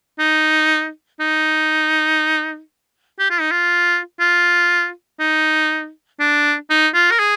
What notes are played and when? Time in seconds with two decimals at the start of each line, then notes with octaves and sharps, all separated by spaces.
0.19 D#4
1.20 D#4
3.19 G4
3.30 F4
3.40 D#4
3.51 F4
4.20 F4
5.19 D#4
6.20 D4
6.70 D#4
6.94 F4
7.11 A#4
7.19 G#4